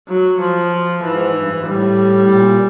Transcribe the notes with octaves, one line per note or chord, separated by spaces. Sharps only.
F#3
F3
G#2 E3
G2
G#2
A2 G3
A#2